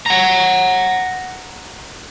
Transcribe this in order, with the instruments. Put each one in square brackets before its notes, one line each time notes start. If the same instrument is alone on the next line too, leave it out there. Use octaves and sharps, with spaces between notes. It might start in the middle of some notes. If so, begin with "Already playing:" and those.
[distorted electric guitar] F#5 A#5